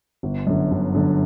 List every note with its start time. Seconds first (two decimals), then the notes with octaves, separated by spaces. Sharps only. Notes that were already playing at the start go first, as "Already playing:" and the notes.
0.23 G1
0.47 F#2 D3
0.71 G1
0.95 F#2 D3